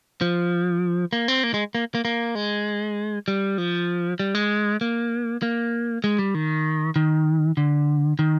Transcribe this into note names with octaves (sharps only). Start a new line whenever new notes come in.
F3
A#3
C4
A#3
G#3
A#3
A#3
A#3
G#3
G3
F3
G3
G#3
A#3
A#3
G#3
G3
D#3
D#3
D3
D#3